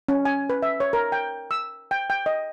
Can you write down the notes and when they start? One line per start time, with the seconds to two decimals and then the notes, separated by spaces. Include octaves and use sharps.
0.09 C#4
0.25 G#5
0.50 B4
0.62 E5
0.80 C#5
0.93 A#4
1.12 G5
1.51 E6
1.91 G5
2.10 G5
2.26 D#5